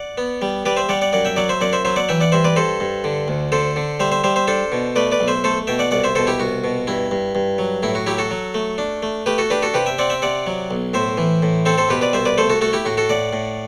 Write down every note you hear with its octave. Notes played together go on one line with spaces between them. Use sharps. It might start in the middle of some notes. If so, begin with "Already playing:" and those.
Already playing: D5 F#5
B3
G3
G3 B4 D5
C5 E5
G3 D5 F#5
D5 F#5
F#2 D5 F#5
E5 G5
F#3 D5 F#5
C5 E5
F#2 D5 F#5
C5 E5
F#3 C5 E5
D5 F#5
E3 E5 G5
D5 F#5
G2 C5 E5
B4 D5
G2 A4 C5
G2
D3
D2
D3 A4 C5
D3
G3 C5 E5
C5 E5
G3 C5 E5
C5 E5
D4 A4 C5
B2
A3 B4 D5
B4 D5
B1
C5 E5
A3 A4 C5
B2 E5 G5
D5 F#5
C2 D5 F#5
C5 E5
B2 A4 C5
E4 G4
C2 F#4
B2
G2 E4
G2
G2
F#3
A2 E4
F#4
F#3 E4 G4
F#4 A4
F#3
A3
D4
A3
A3 G4 B4
F#4 A4
D4 G4 B4
F#4 A4
C3 G4 B4
E5 G5
C4 D5 F#5
E5 G5
C3 D5 F#5
F#3
B1
A2 C5 E5
E3
A2
C4 A4 C5
A4 C5
B2 G4 B4
B4 D5
C2 C5 E5
B4 D5
A3 A4 C5
F#4 A4
A3 F#4 A4
E4 G4
A2 F#4
F#4 A4
A2 D5 F#5
A2